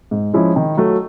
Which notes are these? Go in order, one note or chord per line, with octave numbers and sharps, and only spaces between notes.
G#2
F3 G#3 C#4 E4
D#3
F#3 A3